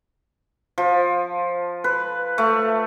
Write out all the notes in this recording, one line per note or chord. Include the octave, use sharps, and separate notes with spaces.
F3
B4
A3